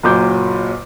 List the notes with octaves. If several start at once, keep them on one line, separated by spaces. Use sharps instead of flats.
F#1 A#2 F#3 D6 G6